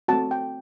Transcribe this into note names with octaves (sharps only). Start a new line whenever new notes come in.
A3 C4 F#4 A5
G5